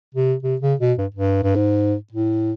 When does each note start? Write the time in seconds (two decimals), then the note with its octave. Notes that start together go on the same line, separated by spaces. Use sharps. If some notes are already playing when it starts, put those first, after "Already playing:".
0.15 C3
0.43 C3
0.61 C#3
0.80 B2
0.98 G2
1.14 G2
1.43 G2
1.55 G#2
2.12 A2